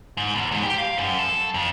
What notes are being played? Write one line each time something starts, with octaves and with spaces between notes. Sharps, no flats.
G#2
E2
G#2
G4
F5
F#2
A4
F2